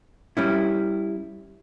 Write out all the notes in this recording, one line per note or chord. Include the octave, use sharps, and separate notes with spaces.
G3 C#4 E4